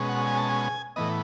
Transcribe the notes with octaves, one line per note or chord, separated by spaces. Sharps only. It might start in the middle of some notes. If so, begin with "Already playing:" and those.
Already playing: B2 G#3 C#4
F#5
G#5
A5
G#5
A2 E3 B3 D#5